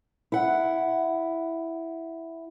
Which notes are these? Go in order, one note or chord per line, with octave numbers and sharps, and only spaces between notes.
E4 F#5